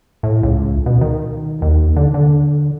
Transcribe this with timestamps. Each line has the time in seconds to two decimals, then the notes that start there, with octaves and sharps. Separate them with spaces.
0.23 A2
0.43 C#2
0.86 B2
1.01 D#3
1.62 D#2
1.96 D3
2.14 D3